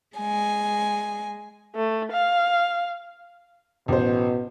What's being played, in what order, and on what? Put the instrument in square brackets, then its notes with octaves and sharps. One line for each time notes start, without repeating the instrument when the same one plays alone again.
[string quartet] G#3 G#5
[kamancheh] A3
F5
[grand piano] A1 C5 [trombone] B2